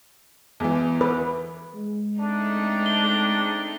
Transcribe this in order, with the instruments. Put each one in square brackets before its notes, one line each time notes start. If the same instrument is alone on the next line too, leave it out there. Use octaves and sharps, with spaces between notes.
[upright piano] E2 E3
[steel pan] B4
[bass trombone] G#3
[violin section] A3 C4 D#4 [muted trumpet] D4
[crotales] G7